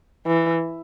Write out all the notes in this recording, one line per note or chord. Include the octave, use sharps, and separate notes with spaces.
E3